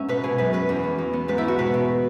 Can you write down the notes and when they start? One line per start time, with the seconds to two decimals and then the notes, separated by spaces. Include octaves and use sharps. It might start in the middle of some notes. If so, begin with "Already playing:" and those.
Already playing: G#2 B3 C#4 E5 F#5
0.08 B2 B4
0.23 B2 G#4
0.38 F#2 B4
0.53 C#4 B4
0.69 E2
0.84 B3
0.98 E2
1.13 B3
1.28 G#2 B4
1.38 E4
1.44 C#4 F#4
1.58 B2 B4
1.74 B2